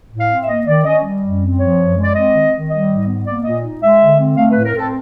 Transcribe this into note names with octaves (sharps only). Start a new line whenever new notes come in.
A2
F5
C4
E5
A#3 D#5
D#3 D5
C#4 D#5
G3
F#2
C4
F3 C#5
F#2
G#3
D5
C4 D#5
D#3
D#3
G3 D#5
G#2
B3
A#3 D5
A#2 D#5
D#4
G#3 E5
D3
C4
A3 F5
A2 B4
A#4
C4 A4